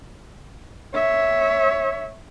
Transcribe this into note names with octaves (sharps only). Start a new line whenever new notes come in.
C#5 E5